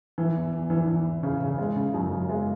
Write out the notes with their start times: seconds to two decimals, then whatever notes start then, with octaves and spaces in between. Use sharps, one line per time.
0.18 E3
0.36 E2
0.53 E2
0.70 E3
0.87 E3
1.05 E2
1.23 C#3
1.41 C#3
1.58 G#3
1.76 C#3
1.94 F#2
2.11 F#2
2.29 G#3